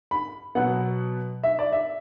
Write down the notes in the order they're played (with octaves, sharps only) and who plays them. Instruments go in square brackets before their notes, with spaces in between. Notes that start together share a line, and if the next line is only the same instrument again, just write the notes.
[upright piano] B5
B2 F#3 B3 F#5
E5
D5
E5